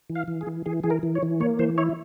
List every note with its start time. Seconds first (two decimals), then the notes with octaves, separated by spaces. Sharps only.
0.10 E3
0.15 F5
0.28 E3
0.41 G#4
0.47 E3
0.66 E3 G#4
0.83 E3 G#4
0.90 A#4
1.03 E3
1.15 C#5
1.22 E3
1.40 A#3 C#5
1.59 E3 C5
1.78 E4 C#5